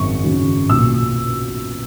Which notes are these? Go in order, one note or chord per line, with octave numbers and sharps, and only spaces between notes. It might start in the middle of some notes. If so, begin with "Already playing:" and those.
Already playing: G#1 F#2 C#3 F#3 C#4 C#6
G#1 F#2 C#3 F#3 C#4
B1 A#2 F#3 E6